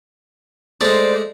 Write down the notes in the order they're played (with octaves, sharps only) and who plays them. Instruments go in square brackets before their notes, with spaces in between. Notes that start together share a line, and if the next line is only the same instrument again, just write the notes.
[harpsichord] G#3 A3 [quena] C5 [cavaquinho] D5